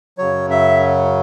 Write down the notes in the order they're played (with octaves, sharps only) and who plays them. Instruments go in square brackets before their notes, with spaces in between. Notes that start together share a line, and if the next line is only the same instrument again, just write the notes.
[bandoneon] F#2 C#3 F#3 C#5
E5